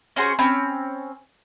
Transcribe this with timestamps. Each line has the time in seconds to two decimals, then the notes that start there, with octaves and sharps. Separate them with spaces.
0.16 C#4 F#4 G#4 C5
0.39 C4 C#4 B5